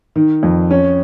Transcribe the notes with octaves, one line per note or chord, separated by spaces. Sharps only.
D#3
F2
C#4